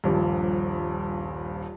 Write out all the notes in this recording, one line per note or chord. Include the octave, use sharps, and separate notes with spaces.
D#1 A#1 G2